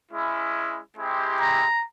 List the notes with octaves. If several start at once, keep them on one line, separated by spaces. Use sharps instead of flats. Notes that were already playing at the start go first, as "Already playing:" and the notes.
G#3 C#4 E4
G#3 C4 E4 G4
A#5